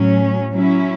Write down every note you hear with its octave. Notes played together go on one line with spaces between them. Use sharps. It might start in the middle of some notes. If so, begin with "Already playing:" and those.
Already playing: A2 F#3 C#4
F#3 C#4 E4